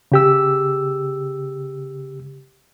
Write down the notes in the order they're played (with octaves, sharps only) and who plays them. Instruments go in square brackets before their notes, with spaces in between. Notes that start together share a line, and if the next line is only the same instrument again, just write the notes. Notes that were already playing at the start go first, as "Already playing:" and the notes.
[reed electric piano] C#3 G4 E6